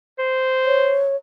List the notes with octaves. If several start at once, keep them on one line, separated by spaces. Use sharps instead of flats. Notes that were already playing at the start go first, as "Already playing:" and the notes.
C5
C#5